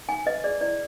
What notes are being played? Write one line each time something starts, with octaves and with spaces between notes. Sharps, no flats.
D#4 G#5
B4 D#5
G#4 D5
E4 D5